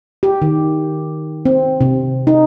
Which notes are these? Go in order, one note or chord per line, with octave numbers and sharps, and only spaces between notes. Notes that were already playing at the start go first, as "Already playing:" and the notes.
G4
D#3
C4
C3
D#4